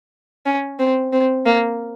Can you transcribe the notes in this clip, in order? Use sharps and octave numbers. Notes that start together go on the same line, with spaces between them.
C#4
C4
C4
A#3